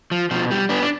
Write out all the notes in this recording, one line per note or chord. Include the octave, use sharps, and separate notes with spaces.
F3
B2 F3
G3
B3 D4
D4